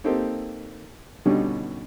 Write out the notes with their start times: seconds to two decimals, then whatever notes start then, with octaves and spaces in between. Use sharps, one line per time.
0.04 A#3 C4 D#4 G4 A4
1.25 G2 B2 D3 G3 C#4 D#4